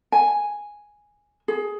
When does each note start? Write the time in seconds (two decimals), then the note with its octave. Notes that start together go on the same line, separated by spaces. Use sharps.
0.12 G#5
1.48 G#4